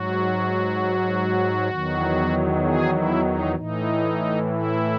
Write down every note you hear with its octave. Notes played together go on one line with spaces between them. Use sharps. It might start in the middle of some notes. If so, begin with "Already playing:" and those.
Already playing: G#2 F#3 F#4
E2 D#3 F#3
G#4
E4
D#4
A2 E3 D#4
E4